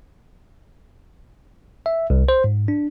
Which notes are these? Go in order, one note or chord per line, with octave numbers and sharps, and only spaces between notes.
E5
C2
C5
G#2
D4